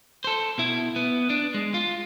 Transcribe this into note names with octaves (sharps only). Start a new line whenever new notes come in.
A4 C5
B2 E4
B3
D4
G#3
F4